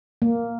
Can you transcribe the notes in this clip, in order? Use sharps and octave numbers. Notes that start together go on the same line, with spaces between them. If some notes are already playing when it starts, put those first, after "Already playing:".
A#3